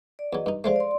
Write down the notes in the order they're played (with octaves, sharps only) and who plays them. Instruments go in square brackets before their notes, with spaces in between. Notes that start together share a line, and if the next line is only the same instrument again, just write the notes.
[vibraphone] D5
[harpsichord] E2 F#3 [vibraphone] D#5
[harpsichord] G2 D#4
[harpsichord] F3 G#3 A3 [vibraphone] C5 D5 F5
[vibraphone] D5 C6